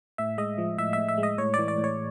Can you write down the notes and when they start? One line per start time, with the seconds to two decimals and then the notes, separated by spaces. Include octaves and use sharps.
0.18 A2 E5
0.38 G#3 D#5
0.58 F3
0.78 A2 E5
0.93 A2 E5
1.08 E5
1.18 G#3
1.23 D#5
1.38 A2 C#5
1.54 E3 D5
1.68 D5
1.78 A2
1.84 C#5